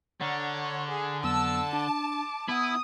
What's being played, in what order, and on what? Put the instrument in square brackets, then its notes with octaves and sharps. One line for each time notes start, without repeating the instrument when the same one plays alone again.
[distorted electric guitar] D3 [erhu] C#5 [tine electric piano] F#5 A#5 F6
[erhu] G#4
[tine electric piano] F2 F#3 B3 [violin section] A5 [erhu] E6
[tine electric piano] D4 [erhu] D6
[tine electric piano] B3 F#5 [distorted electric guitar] E4 [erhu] D#6